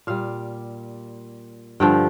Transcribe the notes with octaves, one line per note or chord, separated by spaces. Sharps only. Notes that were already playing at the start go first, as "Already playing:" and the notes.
A#2 G3 F5
G2 D3 F3 G5